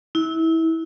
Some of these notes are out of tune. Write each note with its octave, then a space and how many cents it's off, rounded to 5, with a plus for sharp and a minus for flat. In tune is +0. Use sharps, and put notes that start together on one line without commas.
E4 -25